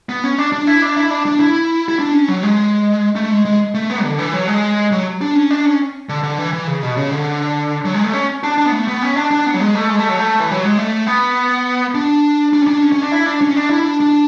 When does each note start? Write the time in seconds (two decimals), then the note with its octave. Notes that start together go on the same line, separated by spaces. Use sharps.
0.09 B3
0.24 C#4
0.38 D4
0.52 D4
0.67 E4
0.82 D4
0.96 E4
1.10 D4
1.26 D4
1.40 E4
1.88 E4
1.99 D4
2.14 C#4
2.28 F#3
2.43 G#3
3.16 A3
3.31 G#3
3.45 G#3
3.74 A3
3.90 B3
4.04 D3
4.19 E3
4.33 F#3
4.47 G#3
4.92 F#3
5.21 D4
5.35 C#4
5.51 D4
5.65 C#4
6.09 D3
6.23 D3
6.38 E3
6.53 E3
6.67 C#3
6.83 B2
6.97 C#3
7.12 D3
7.85 F#3
7.94 G#3
8.04 A3
8.13 C#4
8.43 D4
8.58 D4
8.66 B3
8.72 A3
8.88 B3
9.02 C#4
9.17 D4
9.31 D4
9.46 B3
9.54 F#3
9.61 G#3
9.75 A3
9.89 G#3
9.99 A3
10.09 F#3
10.19 A3
10.40 E3
10.52 F#3
10.65 G#3
10.78 A3
11.07 B3
11.95 D4
12.53 D4
12.62 C#4
12.68 D4
12.82 C#4
12.92 C#4
13.02 D4
13.12 E4
13.26 D4
13.41 C#4
13.56 D4
13.70 E4
13.85 D4
14.00 D4